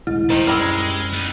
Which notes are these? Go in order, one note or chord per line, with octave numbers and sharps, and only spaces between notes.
D#1 C2 G#3 E4
A2 D#3 C5
F#2 G3 G#3 C4 E6 F6
B3 D#4